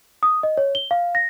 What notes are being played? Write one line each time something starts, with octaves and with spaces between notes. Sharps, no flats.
D#6
D#5
C#5
G7
F5
A#6